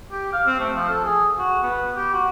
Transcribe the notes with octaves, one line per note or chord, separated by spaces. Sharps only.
G4
F5
C4
A3
F3
A4
G#4
F#4
B3
G4
F#4